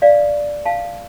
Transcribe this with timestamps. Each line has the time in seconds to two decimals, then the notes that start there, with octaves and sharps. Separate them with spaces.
0.02 D5 F5
0.66 F5 A5